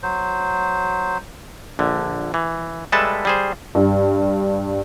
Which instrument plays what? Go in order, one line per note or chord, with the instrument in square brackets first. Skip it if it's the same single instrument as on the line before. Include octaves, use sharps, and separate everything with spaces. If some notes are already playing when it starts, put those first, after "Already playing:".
[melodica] F#3 C5
[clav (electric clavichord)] A#1 D3
E3
G3 G#3 A4 B4 E5 A5
G3 G#4 C5
[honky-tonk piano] G2